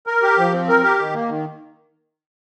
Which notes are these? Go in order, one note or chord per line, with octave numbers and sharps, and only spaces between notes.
A#4
G4
F3
C4
A#4
G4
D#3
A#3
D#3